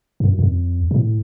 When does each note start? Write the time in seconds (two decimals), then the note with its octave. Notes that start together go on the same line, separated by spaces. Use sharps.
0.20 F#2
0.39 F2
0.91 A2